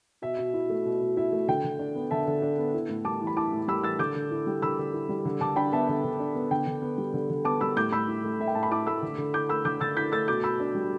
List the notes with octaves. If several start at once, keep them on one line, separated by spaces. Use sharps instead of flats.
B2 E5
B2
E4
A3
B2
B2
E4 E5
A3
D3 G5
D3
D4
B3
D3 E5 A5
D3
D4
B3
E4
A2
G3 A5 D6
E3
B5
E4 A5 D6
A2
G3 B5 E6
E3 E6 A6
D3 D6 G6
D3
E4
G3
D3 B5 E6
D3
E4
G3
D3
D3 A5 D6
D4 G5 B5
B3 E5 A5
D3 E5
D3
D4
B3
D3 G5
D3
B3
G3
D3
D3
B3 A5 D6
G3 B5 E6
A2 D6 G6
A2 B5 E6
E4
A3
A2 E5
G5
A2 A5
B5
E4 A5 D6
A3 B5 E6
D3
D3
E4 D6 G6
A3 B5 E6
D3 D6 G6
D3 E6 A6
E4 G6 B6
A3 E6 A6
B2 D6 G6
B2 B5 E6
D4
G3